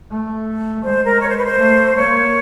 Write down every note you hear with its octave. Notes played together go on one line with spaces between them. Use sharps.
A3
G#3 C5
A#4
C#5
C5
B4
C5
A3
A#3 C#5